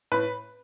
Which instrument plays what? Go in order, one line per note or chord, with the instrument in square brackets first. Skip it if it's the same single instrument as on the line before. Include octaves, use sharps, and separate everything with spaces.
[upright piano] A2 B4